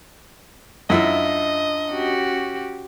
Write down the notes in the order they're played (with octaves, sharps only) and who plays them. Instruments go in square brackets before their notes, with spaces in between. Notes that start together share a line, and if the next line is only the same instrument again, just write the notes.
[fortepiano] F#2 E4 [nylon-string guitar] D4 F4 E5 [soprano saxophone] D#5
[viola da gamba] C#4 F#4 G4